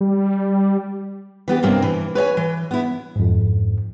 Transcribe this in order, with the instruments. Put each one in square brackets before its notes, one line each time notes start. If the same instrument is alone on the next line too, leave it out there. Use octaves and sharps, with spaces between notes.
[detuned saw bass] G3
[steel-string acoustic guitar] E3 B3 G4
G2 C3 A#3 C4
E3
B4 C#5 D#5 G#5
E3
B3 E4
[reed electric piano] F2 G#2